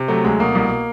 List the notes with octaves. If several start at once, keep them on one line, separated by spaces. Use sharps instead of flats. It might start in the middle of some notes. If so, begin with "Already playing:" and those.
Already playing: C3
F#3 A3
D2 G#3
B2 A#3
C2